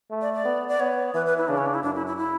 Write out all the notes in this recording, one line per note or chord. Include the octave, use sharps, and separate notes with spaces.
A3
D5
D5
B3
D5
B3 C#5
E3 B4
B4
E4
C#3 D4
C#4
D4
E4
F#2 D4
E4
E4
E4